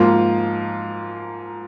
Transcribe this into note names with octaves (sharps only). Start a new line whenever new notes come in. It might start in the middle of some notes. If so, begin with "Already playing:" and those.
Already playing: G#2 F3 A#3 F4